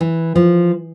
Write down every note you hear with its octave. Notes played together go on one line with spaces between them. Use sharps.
E3
F3